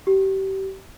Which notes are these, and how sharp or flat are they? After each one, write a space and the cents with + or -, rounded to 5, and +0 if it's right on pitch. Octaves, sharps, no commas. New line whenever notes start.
G4 -30